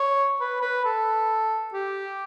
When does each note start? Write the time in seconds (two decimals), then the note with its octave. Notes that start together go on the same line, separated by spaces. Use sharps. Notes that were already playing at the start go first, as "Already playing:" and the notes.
Already playing: C#5
0.40 B4
0.62 B4
0.85 A4
1.73 G4